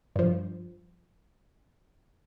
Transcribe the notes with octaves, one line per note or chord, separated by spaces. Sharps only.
G2 F3